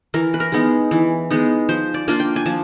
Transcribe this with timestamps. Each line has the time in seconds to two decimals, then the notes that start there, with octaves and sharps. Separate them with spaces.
0.14 E3 A#4
0.34 B4
0.40 A#4
0.52 G#3 B3 D#4
0.91 E3
1.31 G#3 B3 D#4
1.69 F3 C5
1.94 D5
2.08 A#3 D4 F4
2.20 G5
2.36 G#5
2.46 F3 A5